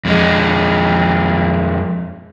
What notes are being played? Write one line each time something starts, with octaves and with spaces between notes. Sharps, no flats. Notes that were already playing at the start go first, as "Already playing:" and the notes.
F2 G#3